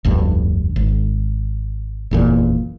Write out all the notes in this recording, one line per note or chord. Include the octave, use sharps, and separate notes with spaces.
F1 D2 G2
G#1
F#1 E2 A#2